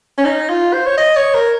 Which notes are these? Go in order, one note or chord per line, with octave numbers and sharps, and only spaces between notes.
C#4
D#4
F4
C5
C#5
D#5
C#5
A#4